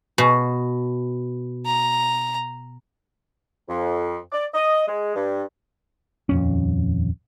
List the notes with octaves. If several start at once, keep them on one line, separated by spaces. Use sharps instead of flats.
B2
A#5
F2
D5
D#5
G#3
G2
D#1 F2 C#4